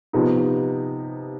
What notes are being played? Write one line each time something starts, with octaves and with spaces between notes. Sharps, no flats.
C3 F3 B3 D#4